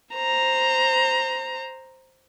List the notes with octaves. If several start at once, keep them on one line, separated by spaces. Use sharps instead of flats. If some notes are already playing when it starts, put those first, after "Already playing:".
C5 A#5